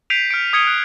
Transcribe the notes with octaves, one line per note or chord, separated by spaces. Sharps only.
G6 B6 C7 D7 D#7 F7
F6 B6 C#7 D7
D#6 G#6 C#7 D#7 G7
F#6